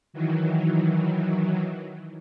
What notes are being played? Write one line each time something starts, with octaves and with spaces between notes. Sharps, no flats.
D#3 E3 F#3